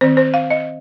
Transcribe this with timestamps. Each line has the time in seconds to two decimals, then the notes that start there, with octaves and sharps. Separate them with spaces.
0.01 D#3 C4 C5
0.17 C5
0.34 F5
0.50 D#5